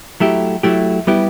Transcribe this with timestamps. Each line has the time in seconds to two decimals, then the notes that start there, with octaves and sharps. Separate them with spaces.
0.20 F#3 A3 E4 G4
0.63 F#3 A3 E4 G4
1.07 G3 B3 E4 G4